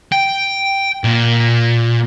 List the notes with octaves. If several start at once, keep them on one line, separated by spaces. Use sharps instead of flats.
G5
A#2